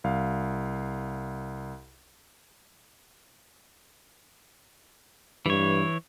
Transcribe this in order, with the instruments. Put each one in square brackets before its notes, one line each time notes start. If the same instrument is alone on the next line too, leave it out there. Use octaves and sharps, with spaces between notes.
[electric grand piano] C2 F5
[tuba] G2 [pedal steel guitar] E3 C#5